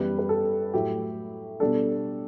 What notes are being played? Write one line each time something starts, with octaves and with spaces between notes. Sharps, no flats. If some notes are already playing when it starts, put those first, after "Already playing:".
Already playing: F#2 E3 G3 B3 B4
B4
A4
A2 F#3 A3 E4 G4
B2 G3 D4 A4